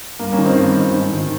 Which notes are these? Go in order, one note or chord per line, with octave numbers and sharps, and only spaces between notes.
G2 A#3
A#3 C#4
D#3
C4 D#4
G2
D#3
G#2
D#3